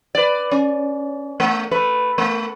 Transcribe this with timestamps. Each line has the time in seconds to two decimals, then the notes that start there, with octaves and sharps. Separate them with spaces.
0.15 B4 D5
0.51 C#4
1.40 A3
1.71 A3 B4
2.18 A3